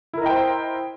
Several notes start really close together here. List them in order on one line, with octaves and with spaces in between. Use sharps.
E4 A#4 D#5 G5 C5